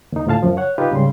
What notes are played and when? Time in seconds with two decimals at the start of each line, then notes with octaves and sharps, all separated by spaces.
0.12 D#2 D#4
0.26 D2 A2 F4 F5 A5
0.43 F#2 F3
0.57 C#5 F#5
0.78 D#4 F4 G4 B4
0.91 G#2 C#3 G3 C6